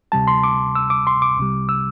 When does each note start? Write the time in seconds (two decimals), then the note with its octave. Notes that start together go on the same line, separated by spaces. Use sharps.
0.12 D2 C3 G3 A5
0.27 C6
0.43 D6
0.75 E6
0.90 D6
1.07 C6
1.22 D6
1.37 C2 C3 G3
1.69 E6